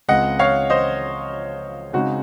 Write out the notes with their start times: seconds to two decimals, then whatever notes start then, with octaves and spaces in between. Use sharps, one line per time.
0.08 C#2 C#3 G#3 C4 F4 D#5 F#5
0.39 C#5 F5
0.70 C5 D#5
1.93 C#3 G#3 C4 D#4 F#4